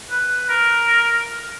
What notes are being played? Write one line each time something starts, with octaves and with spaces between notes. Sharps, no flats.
B4
A#4